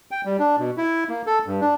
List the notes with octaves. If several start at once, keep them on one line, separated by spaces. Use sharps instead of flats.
G5
G3
D4
B2
E4
A#3
A4
G2
D4